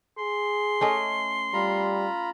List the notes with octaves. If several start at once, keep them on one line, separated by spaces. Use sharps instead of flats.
G#4 C6
A3 C#4 D#5
G3 F4 A#5 B5